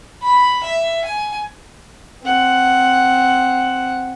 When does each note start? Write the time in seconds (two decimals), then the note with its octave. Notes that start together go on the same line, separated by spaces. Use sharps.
0.24 B5
0.64 E5
1.05 G#5
2.24 C4 F#5